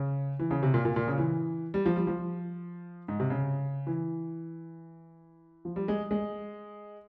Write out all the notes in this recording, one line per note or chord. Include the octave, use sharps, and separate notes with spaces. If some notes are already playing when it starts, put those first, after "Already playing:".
Already playing: C#3
E3
C#3
C3
A#2
A#2
A#2
C#3
E3
G3
F3
G3
F3
G#2
C3
C#3
E3
F3
G3
G#3
G#3